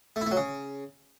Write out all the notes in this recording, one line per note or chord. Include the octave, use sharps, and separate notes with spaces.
A3
E4
A3
F#3
C#3